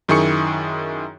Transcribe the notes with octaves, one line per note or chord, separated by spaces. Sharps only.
F#2 D#3 E4 G#4 C#6 C#7